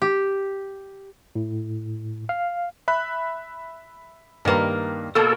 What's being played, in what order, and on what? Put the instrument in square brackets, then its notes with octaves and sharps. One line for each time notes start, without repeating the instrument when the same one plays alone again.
[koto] G4
[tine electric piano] A2
F5
[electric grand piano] E5 B5 F#6
[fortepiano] G2 B4 [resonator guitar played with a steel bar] D#3 A#3
[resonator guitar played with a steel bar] B2 A#3 [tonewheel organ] A4